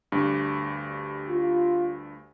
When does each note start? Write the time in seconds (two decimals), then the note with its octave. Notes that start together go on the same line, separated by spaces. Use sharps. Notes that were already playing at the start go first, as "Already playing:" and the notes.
0.12 D2 G2
1.29 F4